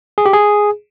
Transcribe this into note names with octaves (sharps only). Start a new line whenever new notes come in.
G#4
G4
G#4